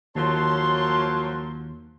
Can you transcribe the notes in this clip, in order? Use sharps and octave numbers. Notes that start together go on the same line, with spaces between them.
D#2 F3 F#3 A#3 C#5 A5 C6